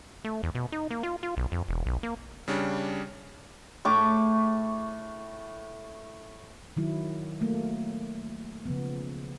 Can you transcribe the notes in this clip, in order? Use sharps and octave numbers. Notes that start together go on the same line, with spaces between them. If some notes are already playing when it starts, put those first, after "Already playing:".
A3
E2
B2
D#4
A#3
F4
F4
B1
F2
E1
B1
A#3
C#3 G3 C#4 D4
A2 C#6 D6
D#3 F#3 E4
F#3 A3 A#3
C#3 F3 B3